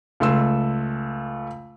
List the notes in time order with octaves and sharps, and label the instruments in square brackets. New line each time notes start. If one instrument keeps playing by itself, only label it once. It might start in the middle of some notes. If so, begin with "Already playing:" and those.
[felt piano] C#2 A3 C6 E6